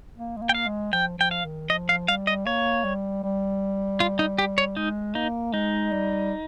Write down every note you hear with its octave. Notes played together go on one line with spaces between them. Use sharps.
A#3
G#3
A#3
G5
F5
G#3
F3 G5
F3 G5
F5
D#3
F3 D#5
F5
G3 F5
D#5
A#3 C#5
G3
G3
F4
D#4
G4
C#5
G#3 D#4
A#3 D#4
G#3 D#4
G3